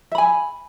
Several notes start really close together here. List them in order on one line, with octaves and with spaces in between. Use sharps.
E5 B5 G#5